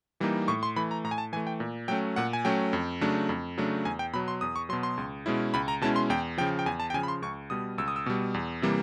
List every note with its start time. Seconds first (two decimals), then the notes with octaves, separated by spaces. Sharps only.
0.20 E3 G3 A#3 D#4
0.48 A2 C#6
0.63 C6
0.76 E3 A3 B5
0.91 A#5
1.04 A2 A#5
1.11 G#5
1.18 A5
1.33 E3 G#5
1.37 A3
1.47 G5
1.60 A#2
1.88 F#3 A3 C#4 G5
2.16 A#2 F#5
2.33 G#5
2.45 F#3 A3 C#4 G5
2.73 F2
3.01 C#3 F#3 A3 D4
3.29 F2
3.58 C#3 F#3 A3 D4
3.85 E2 G#5
3.99 G5
4.13 B2 F#3 B5
4.28 C6
4.41 E2 D#6
4.56 C#6
4.69 F#3 C6
4.73 B2
4.83 C6
4.97 C#2
5.26 B2 G#3 C#4 E4
5.54 C#2 B5
5.68 A#5
5.81 B2 G#3 C#4 E4 A5
5.96 C6
6.10 E2 G5
6.38 C#3 F3 G5
6.59 G5
6.66 E2 G#5
6.80 A5
6.90 G5
6.94 C#3 F3 G#5
7.03 B5
7.08 C6
7.22 C#2 C#6
7.50 B2 G3 D#6
7.78 C#2 E6
7.88 D#6
7.96 E6
8.06 B2 G3
8.34 E2
8.62 C3 E3 G3 A#3